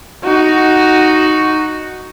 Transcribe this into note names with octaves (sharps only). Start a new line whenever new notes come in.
D#4 F#4